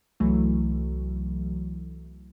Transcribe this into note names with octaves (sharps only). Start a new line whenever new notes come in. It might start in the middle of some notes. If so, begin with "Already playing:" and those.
C2 E3 F#3 A3